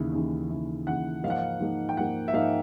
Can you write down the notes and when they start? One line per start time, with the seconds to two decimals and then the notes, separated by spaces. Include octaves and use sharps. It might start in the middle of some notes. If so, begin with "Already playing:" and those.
Already playing: D#2 C#3 E3
0.13 D#2 C#3 E3
0.50 D#2 C#3 E3
0.87 D#2 C#3 E3 F#5
1.23 G#2 F3 A#3 D#4 F5
1.30 F#5
1.38 F5
1.60 G#2 F3 A#3 D#4
1.89 G5
1.97 G#2 F3 A#3 D#4 F#5
2.28 E5
2.33 G#2 F3 A#3 D#4 F5